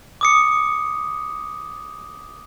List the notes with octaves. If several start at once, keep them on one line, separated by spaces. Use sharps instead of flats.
D6 D#6 C#7